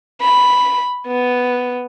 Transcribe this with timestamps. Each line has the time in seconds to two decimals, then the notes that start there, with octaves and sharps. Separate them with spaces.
0.21 B5
1.07 B3